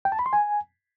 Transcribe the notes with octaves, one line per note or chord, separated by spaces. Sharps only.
G5
A5
B5
C6
G#5